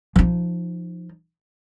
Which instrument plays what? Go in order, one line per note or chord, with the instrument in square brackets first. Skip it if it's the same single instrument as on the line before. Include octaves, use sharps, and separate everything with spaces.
[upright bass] F3 D#4